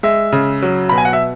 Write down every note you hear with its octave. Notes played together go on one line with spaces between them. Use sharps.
G#3 E5
C#3
F#3
B2 B5
G#5
F#5
E5